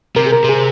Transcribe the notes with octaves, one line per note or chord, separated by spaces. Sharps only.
C3 A#4
G#4
A#4
C3
G#4